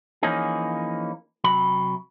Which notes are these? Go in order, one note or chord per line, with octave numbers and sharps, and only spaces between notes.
E3 F3 A#3 C#4 D#4 G#4
C3 F#3 B5